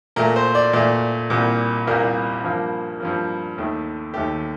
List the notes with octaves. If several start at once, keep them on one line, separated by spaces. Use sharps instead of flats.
A#2 A3 A#4
C5
D5
A#2 A3 D5
C2 A#2 G3 A#3
C2 A#2 G3 A#3 A#4
G2 F3 A#3
G2 F3 A#3
D#2 D#3 A3
D#2 D#3 A3 G4